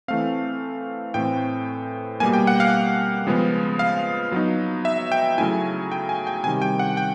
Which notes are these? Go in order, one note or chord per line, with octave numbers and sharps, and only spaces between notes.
E3 A3 C4 F5
A2 E3 A3 C4 G5
B2 G3 A#3 G#5
G5
F#5
F5
C#3 F3 G#3 B3
F5
F#3 B3 D#4
E5
G5
C#3 F#3 A3 C#4 E4 G#5
G5
G#5
G5
C3 D#3 G3 G#5
G5
F#5
G5